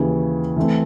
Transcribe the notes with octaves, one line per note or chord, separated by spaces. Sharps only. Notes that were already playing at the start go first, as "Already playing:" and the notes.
Already playing: D#2 C#3 E3
E3 A3 C4